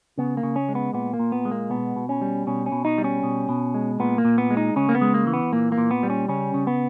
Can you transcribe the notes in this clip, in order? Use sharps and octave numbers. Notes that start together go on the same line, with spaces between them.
C#3 B3
A#3
C#3
C#4
G#3
B3
A#2 B3
A#3
A#2
B3
G#3
A#3
B2 B3
B2
C#4
G3
B2 C#4
C#4
B2
D#4
G3
C#4
B2
B2
G#3
A#2 B3
A#3
A#2
B3
G#3
D#4
C#3 C#4
A#3
B3
G#3
A#3
E3
B3
A#2 A#3
A#3
A#2
B3
G3
C#4
C#3 C#4
C#3
B3